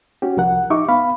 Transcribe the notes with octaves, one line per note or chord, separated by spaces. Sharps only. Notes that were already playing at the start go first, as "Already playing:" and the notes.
C#4 F#4 G4
C2 F3 A#4 F#5
D#4 G4 E5 C#6 D6
B3 F5 B5